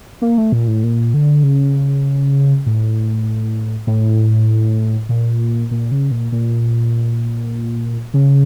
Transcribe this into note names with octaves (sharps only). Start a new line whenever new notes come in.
A#3
A3
A#2
A2
A#2
D3
C#3
A2
A2
A#2
A#2
C#3
A#2
A#2
C#3